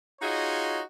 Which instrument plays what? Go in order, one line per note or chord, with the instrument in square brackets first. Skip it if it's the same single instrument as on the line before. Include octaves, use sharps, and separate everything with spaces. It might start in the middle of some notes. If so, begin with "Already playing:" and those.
[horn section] D#4 F4 F#4 G#4 C#5 D#5